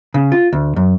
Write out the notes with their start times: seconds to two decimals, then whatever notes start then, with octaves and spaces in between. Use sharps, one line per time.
0.14 C#3
0.32 F4
0.53 D2
0.76 F#2